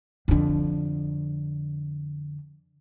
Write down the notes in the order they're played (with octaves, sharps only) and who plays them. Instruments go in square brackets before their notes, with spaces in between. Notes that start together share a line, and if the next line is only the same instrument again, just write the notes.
[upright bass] F2 D3